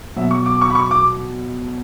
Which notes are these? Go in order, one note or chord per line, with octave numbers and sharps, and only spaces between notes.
B2 F#3 E5
C#6
D6
C#6
B5
C#6
D6